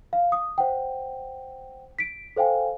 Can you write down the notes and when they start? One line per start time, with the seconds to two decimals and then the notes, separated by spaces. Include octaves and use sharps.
0.13 F5
0.32 D#6
0.58 C5 F#5 G5
1.99 B6 D7
2.36 A4 C5 F5 G5 G#5